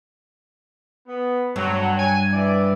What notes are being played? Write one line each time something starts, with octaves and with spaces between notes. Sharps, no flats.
B3
G2 F#3
G#5
E3 D5